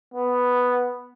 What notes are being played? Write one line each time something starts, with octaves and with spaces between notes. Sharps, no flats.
B3